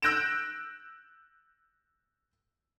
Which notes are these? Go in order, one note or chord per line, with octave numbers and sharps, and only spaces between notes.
E6 F#6 G6 A#6 D7 E7